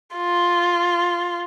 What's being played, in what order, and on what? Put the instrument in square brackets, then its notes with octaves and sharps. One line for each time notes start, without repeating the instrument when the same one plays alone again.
[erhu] F4